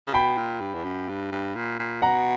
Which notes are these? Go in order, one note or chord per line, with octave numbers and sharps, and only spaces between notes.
C#3
B2 G5 B5
A#2
G2
E2
F#2
G2
G2
A#2
A#2
B2 F#5 A#5